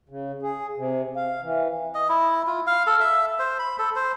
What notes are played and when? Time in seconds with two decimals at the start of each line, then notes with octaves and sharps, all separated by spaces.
0.09 C#3
0.42 G#4
0.77 C3
1.16 F5
1.43 E3
1.94 D#5
2.09 E4
2.47 F4
2.67 F5
2.87 A4
3.00 E5
3.39 C5
3.59 B5
3.79 A4
3.96 C5